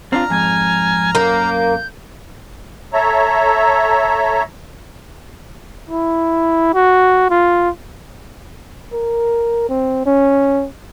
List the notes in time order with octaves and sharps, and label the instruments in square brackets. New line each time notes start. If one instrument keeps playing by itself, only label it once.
[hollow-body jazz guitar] C4 D4 F4 [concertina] A#5 F6
[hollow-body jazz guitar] F2 G#2 [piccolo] G#5
[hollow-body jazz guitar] F#2 [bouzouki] A#3 [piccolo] G6
[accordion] A4 C#5 E5 A#5
[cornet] E4
F#4
F4
[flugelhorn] A#4
C4
C#4